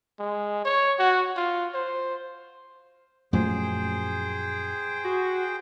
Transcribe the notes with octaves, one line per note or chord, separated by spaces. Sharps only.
G#3
C#5
F#4
F4
C5
F#2 A#2 F3 A3 G#4 C5 G5
F#4